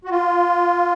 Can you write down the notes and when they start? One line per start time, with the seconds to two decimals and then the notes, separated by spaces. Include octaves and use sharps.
0.05 F#4
0.10 F4